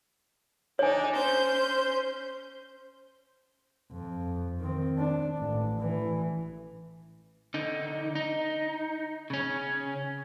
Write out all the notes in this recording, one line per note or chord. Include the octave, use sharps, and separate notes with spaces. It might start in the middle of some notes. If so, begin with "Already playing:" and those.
D4 D#4 C#5 G#5
C#4 C5 C6 G6
F2
D#3 C4
D4
A1
E3
D3 D#4
D#4
C#3 C#4